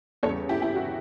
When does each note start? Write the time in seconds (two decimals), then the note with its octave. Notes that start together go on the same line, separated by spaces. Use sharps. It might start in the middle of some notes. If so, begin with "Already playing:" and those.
0.23 E2 C#3 G3 A4 C#5
0.49 E4 G4
0.62 E4 G4
0.75 F#4